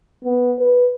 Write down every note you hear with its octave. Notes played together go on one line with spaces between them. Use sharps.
B3
B4